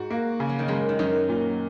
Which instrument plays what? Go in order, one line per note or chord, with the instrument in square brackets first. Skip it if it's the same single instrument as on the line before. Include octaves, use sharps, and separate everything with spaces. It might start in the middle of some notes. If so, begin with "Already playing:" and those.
Already playing: [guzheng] G#2 [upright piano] F#4
[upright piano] A#3
C#3
[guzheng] F#3
D#3
[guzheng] F#2 F#3 [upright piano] G#3
[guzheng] D#3
[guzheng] F#2 F#3 [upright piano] D#4
[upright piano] A#2